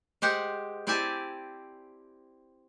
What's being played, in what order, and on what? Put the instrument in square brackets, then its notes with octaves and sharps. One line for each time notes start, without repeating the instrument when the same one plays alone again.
[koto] G#3 G4 C5 F#5
C4 E4 G4 D5 G#5 A5